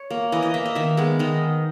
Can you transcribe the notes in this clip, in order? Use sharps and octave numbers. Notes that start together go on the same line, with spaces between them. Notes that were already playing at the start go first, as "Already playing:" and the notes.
Already playing: C#5
A#3
E3 D#5
D#5
A#3 E5
D#5
D#3 E5
G#3 B3
D#3 D#5